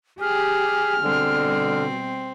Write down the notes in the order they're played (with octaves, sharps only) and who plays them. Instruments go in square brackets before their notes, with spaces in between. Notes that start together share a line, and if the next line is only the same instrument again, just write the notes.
[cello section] G4 [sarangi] G#4 [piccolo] F6
[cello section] B2 G3 [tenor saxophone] D3 [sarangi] C4